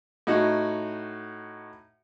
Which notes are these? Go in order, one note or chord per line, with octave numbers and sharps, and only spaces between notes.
A2 D#4 F#4